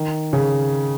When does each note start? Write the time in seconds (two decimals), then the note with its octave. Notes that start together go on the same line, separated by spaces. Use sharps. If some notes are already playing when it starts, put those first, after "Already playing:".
Already playing: D#3
0.33 C#3